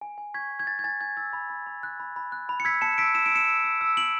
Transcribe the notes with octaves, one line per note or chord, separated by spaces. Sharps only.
G#5
G#5
C#6 G#6 B6
G#5
G#6
G#5 A6
G#6
G#5 A6
G#5 G#6
E6 A6
B5
B5
B5
F#6
B5
B5
F#6
B5
C#7
E6 G#6 B6
A5 C#7 E7
E6 B6 D7
E6 E7
D7
E6 C#7 E7
E6
E6
E6
E6 D7 F#7